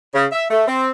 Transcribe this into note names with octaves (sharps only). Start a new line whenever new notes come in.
C#3
E5
A3
C4